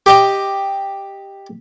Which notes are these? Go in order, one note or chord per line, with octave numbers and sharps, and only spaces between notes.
G4 D#5 G5